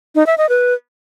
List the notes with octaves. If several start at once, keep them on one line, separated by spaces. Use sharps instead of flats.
D#4
E5
D#5
B4